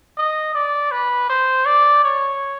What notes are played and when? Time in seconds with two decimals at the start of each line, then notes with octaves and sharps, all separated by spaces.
0.18 D#5
0.55 D5
0.91 B4
1.29 C5
1.66 D5
2.03 C#5